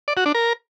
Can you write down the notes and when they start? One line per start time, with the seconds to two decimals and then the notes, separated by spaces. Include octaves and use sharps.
0.08 D5
0.17 F#4
0.26 D4
0.35 A#4